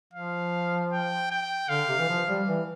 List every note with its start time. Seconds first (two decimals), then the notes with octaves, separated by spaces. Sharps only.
0.13 F3 F5
0.92 G5
1.31 G5
1.69 D3 F5
1.89 C3
1.99 E3
2.09 F3
2.28 G3
2.47 E3